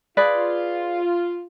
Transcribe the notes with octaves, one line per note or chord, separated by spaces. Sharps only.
F4 G#4 B4 D5